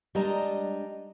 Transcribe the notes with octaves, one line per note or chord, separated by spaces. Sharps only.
G3 G#3 D4 D#5 A5 A#5